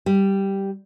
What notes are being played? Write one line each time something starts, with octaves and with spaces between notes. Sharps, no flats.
G3